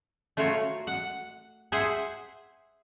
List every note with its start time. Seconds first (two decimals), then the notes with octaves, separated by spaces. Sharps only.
0.37 A3 F4 F#4 A#4 C#5
0.87 F#5
1.72 G#4 C5 E5 F#5 G#5